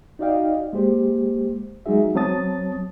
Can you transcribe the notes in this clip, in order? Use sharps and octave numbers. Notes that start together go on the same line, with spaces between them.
D#4 F#4 D5 D#5 F5 G5
G#3 A#3 G4 C5
F#3 G#3 D#4 F#4 G#4 E5
F#3 C4 C#5 A5 D#6 A6